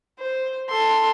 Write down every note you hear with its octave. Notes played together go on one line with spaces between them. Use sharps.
C5
A4 C6